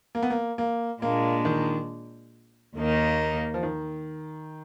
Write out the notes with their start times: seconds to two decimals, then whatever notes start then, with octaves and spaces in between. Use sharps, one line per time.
0.15 A#3
0.22 B3
0.30 A#3
0.58 A#3
1.02 A#2 G#3 A#3 D4
1.45 D#3
2.76 D#2 D#3 A#3 D#4
3.54 F3
3.63 D#3